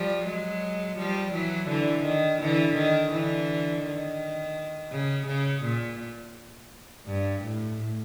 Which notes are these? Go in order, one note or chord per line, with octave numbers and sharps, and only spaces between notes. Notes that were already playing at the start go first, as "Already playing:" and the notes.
Already playing: F3 G3
F#3 G#3
F3 G3
E3 F#3
D3 E3
D#3
D3 E3
D#3
D3 E3
D#3
C#3
C#3
A#2
G2
A2